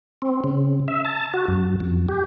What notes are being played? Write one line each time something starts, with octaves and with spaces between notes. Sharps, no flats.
C4
C#3
E5
A5
F#4
F#2
F2
G4